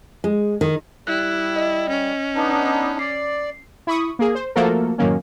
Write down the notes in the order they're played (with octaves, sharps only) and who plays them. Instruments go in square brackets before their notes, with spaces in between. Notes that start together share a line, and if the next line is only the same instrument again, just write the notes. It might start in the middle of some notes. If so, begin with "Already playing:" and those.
[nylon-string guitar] G#3
D#3
[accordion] G3 [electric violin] E4 [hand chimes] F#6
[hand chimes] D#5
[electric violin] C#4
[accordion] B3 D4 D#4
[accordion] D5 [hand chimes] C7
[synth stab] E4 B5 C#6 D#6
A#3 G#4
C5
F3 A3 A#3 F#4 A4 A#4
F#2 A2 D#3 F#3 A#3 C#4